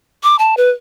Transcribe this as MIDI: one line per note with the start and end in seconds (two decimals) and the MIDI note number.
0.23 0.36 86
0.39 0.57 81
0.57 0.71 71